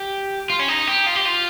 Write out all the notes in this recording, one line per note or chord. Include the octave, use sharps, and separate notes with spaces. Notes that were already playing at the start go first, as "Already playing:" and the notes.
Already playing: G4
F4
C#4
D#4
G4
F4
G4
F4